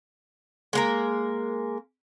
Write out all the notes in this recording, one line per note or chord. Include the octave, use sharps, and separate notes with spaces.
G#3 A#3 A#4